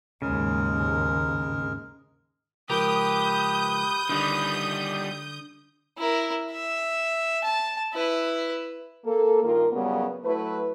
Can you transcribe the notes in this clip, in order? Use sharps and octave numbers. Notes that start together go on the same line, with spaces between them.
D#2 G#2 C#3 G#3 A#4
C#2 F3 G4 A#4 B4 D#6 G6
D3 D#3 G3
E4 A#4
E5
A5
E4 B4
A#3 A4
G2 D#3 A#3 F4 A#4
A#2 C#3 F#3 G3 B3
F#3 A3 E4 B4